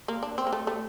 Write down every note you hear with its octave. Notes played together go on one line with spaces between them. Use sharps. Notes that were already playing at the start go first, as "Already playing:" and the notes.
A#3
D4
C4
A#3
A3
A3